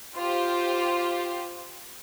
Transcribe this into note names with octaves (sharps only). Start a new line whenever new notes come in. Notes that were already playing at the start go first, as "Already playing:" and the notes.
F4 G4 C5